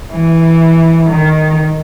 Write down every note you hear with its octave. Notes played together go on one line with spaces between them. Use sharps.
E3
D#3